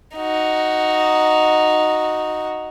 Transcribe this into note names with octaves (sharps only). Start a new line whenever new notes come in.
D#4 F#4